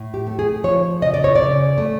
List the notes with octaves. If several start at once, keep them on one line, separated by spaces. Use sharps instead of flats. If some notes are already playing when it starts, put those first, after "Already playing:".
Already playing: A2
G4
A3
G#4
F3 C#5
C#3 D#5
D5
C#5
C#3 D5
A3